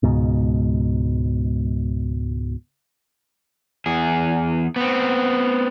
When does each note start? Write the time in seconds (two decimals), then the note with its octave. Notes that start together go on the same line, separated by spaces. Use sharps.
0.03 C#2 G#2 B2
3.86 E2 G#4
4.76 B3 C4